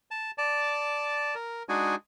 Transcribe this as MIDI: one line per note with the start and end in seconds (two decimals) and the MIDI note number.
0.11 0.31 81
0.38 1.35 74
0.38 1.35 81
1.35 1.63 70
1.69 1.95 56
1.69 1.95 62
1.69 1.95 63
1.69 1.95 66
1.69 1.95 68
1.69 1.95 80